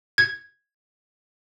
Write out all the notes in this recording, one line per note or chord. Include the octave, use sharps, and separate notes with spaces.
G#6